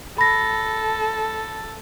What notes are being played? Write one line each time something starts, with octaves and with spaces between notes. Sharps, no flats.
A4 B5 A#6